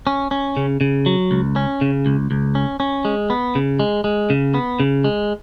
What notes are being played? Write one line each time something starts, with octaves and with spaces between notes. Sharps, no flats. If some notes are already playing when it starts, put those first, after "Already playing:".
C#4
C#4
C#3
C#3
F#3
C#2
C#4
C#3
C#2
C#2
C#4
C#4
G#3
B3
C#3
G#3
G#3
C#3
B3
C#3
G#3